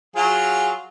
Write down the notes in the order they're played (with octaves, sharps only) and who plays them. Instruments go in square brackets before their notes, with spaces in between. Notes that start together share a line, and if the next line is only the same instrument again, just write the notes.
[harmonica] F#3 F4 G#4